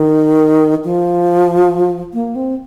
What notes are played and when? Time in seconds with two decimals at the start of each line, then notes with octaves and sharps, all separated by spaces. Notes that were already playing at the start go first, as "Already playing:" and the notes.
Already playing: D#3
0.84 F3
2.14 A#3
2.35 C4